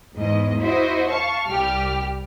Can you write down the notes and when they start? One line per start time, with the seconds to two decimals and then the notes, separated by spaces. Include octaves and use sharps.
0.15 E2 G#2 D#5
0.60 E4 F#4 C5 D#5
1.09 F5 A5 C#6
1.48 C2 G3 G4 F6